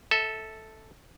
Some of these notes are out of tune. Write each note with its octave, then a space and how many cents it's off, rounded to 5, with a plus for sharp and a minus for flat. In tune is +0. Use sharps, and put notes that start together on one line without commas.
A4 +0 E5 -25